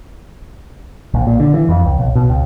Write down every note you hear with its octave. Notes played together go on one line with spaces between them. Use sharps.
A#1
A#2
D3
E3
F2
C#2
B1
B2
C#2